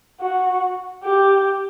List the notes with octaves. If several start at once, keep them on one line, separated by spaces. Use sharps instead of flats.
F#4
G4